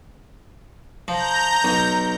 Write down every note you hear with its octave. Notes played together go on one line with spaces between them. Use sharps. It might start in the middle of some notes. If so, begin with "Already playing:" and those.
F3 A#5 G6
B1